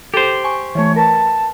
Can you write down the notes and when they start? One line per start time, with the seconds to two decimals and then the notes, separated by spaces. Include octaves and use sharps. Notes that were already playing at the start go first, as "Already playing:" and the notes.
0.14 G4 A4 C5
0.44 G#5 C#6
0.75 E3 A3 C#5
0.96 A#4 B4 A5